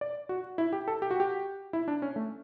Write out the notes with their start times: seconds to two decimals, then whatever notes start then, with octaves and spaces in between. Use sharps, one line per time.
0.01 D5
0.29 F#4
0.58 E4
0.73 G4
0.88 A4
1.02 G4
1.11 F#4
1.20 G4
1.73 E4
1.88 D4
2.02 C#4
2.16 A3